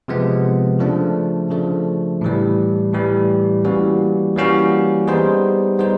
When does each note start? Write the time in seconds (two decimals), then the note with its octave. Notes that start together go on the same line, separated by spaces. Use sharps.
0.08 C3 F3 G#3 B3
0.79 C#3 F3 A3 D4
1.51 C#3 F3 A3 D4
2.21 A2 E3 G3
2.93 A2 E3 G3
3.65 E3 G3 A#3 C#4 F#4
4.36 E3 G3 A#3 C#4 F#4
5.07 G3 B3 D#4 G#4 C5
5.79 G3 B3 D#4 G#4 C5